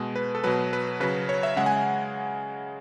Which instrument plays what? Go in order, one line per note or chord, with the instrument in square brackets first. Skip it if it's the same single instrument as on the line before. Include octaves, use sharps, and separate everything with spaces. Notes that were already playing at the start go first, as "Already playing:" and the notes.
Already playing: [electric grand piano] B2 G#3
B4
A4
B2 F#3 B4
B4
C#3 F#3 B4
C#5
E5
C#3 G#3 F#5
G#5